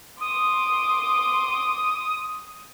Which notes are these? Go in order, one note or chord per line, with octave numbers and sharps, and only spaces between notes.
C6 D6 D#6